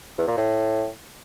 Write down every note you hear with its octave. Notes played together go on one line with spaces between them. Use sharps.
E2
A#2
A2